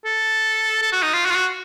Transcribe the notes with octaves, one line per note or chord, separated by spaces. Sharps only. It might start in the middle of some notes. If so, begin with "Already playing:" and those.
A4
A4
F#4
D#4
F4
F#4
F4
F#4